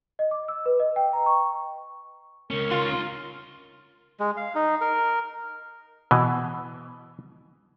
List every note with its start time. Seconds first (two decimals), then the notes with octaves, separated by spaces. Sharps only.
0.19 D#5
0.31 D6
0.48 E6
0.66 B4
0.80 D#5
0.96 G5
1.13 A#5
1.26 C#6
2.51 C#2 C#4 A#4
2.71 D#4 F4 C6
4.20 G#3
4.37 F5
4.55 D#4
4.81 A#4
6.11 B2 E3